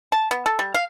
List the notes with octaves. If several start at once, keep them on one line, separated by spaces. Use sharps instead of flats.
A5
B3
A4
G3
F5